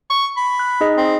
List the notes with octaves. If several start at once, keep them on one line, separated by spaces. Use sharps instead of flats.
C#6
B5
F#6
D#4 G#4 D#5
C4